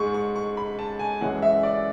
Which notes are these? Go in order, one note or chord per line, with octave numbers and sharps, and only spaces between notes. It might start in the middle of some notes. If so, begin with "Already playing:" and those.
Already playing: G#2 G#3 C#6
C#6
C#6
B5
A5
G#5
F#2 E3 G#3 F#5
E5
D5